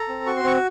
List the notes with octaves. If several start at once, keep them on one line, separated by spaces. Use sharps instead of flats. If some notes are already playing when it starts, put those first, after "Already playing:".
Already playing: A4 A#5
C4
F#4 C#6
C6
C4 C#6